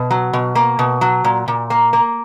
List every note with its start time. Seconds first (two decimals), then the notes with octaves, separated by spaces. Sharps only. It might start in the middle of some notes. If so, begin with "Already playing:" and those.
Already playing: B2
0.11 F#3
0.33 B2
0.55 A#3
0.79 B2
1.01 F#3
1.24 A#2
1.48 A#2
1.70 A#3
1.93 A#3